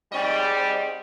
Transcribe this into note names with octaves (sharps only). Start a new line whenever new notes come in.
G#2 G3 C4 D#5